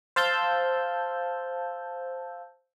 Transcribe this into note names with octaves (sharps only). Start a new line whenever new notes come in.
C5 F5 A5 E6 G6